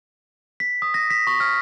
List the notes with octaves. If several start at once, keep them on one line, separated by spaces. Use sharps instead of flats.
B6
D#6
A#6
B6
C#6
F6